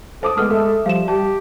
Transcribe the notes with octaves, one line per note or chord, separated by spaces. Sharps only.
A4 C5 A5 D6 D#6
G#3 A3 B3 D#6 F6
A4 E5
F3 G3 F5 E7
G4 A5